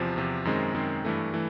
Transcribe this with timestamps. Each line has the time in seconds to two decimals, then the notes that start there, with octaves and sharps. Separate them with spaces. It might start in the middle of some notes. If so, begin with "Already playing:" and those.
Already playing: E2 C3 F3
0.16 E2 C3 F3
0.45 F#2 D#3 G#3 C4
0.74 F#2 D#3 G#3 C4
1.04 G2 E3 A3
1.34 E3 A3